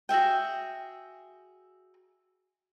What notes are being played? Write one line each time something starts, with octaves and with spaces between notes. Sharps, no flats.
F#4 G#4 E5 G5